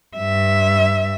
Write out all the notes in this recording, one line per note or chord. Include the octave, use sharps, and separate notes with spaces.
G2 E5